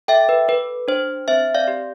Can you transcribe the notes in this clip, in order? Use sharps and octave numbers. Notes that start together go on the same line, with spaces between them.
A4 E5 G5
B4
A4 B4
D4 C5
C4 C5 E5
D5 F5
G4